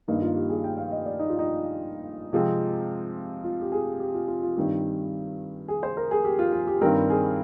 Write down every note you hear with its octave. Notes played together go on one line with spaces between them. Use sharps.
G2 D#3 A#3 D#4
F4
G4
G#4
G5
F5
D#5
D5
D#4
F4
D#4
C3 F3 G#3 C4
F4
G4
G#4
G4
F4
F4
F4
G2 D#3 G3 C4 G4
G#4
C5
A#4
G#4
G4
F4
F4
G4
G2 D#3 G3 C4 A#4
G#4